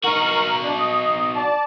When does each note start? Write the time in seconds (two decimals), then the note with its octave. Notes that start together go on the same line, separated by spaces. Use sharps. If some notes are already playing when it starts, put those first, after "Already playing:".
0.04 D#4 F#4 A#4 C#6
0.63 D4
0.78 D#5
1.36 D5 A5